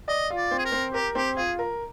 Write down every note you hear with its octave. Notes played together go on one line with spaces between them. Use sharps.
D5 D#5
F4
D5
C4
G#4
A#4
C4
G4 A#4
C4 G4
F4 G#4
A#4